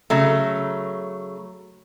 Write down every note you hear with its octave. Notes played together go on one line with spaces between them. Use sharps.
C#3 F#3 A3